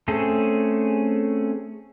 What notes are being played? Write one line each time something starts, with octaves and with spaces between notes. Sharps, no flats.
A3 C4 C#4 G#4 A4